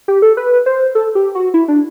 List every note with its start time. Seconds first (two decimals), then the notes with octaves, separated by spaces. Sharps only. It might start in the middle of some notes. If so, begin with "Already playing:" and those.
0.08 G4
0.22 A4
0.37 B4
0.66 C5
0.95 A4
1.15 G4
1.35 F#4
1.54 E4
1.68 D4